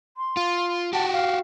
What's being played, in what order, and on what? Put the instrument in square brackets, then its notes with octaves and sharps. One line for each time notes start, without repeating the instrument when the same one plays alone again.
[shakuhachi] C6
[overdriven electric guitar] F4
[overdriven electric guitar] F#4 G4 [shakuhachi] A5
[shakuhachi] F5